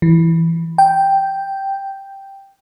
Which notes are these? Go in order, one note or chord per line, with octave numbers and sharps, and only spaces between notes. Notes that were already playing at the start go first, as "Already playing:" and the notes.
E3
G5